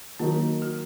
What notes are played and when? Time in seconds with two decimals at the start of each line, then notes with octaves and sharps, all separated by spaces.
0.19 D#3 F#3 A#3 D#4 A#4
0.62 F#4